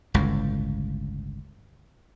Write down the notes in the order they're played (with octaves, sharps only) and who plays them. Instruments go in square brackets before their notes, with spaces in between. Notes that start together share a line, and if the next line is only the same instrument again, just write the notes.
[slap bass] G1 C#2 A2